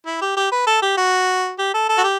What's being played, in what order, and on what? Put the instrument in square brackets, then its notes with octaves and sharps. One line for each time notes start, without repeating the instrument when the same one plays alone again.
[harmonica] E4
G4
G4
B4
A4
G4
F#4
G4
A4
A4
F#4
G4